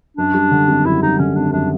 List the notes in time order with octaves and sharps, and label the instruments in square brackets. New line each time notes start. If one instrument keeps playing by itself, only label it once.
[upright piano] F#2 [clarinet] D4
[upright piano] G3
D3
G#1
[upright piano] F#2 [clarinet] E4
[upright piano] G3 [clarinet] D#4
[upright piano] D3 [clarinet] C#4
[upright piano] G#1 [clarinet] D4
[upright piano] F#2 [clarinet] D4